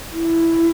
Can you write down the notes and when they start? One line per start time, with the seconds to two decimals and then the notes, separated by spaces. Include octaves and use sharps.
0.12 E4